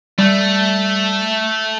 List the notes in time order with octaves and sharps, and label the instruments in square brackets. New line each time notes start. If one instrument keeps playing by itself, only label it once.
[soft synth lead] G3 [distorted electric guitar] A3